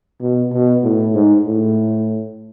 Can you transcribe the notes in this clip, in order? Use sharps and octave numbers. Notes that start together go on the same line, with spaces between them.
B2
B2
A2
G#2
A2